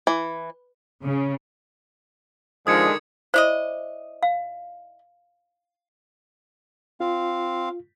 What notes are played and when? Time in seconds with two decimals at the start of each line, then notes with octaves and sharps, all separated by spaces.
0.07 E3
1.03 C#3
2.67 D3 D#3 F3 G#3 D#6 G#6 C#7
3.34 E4 C5 D5 D#5
4.23 F5
7.00 C4 F4 F5